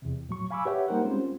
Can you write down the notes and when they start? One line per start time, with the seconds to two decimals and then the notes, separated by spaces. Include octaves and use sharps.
0.02 E2 C3
0.29 A2 F#3 C#6
0.51 F5 G#5 B5 C#6 D6 E6
0.65 G4 B4 C#5 E5 F#5 G5
0.88 G3 A#3 D#4 A#4 C5 F#5
1.05 G3 G#3 C4 C#4 F4 C5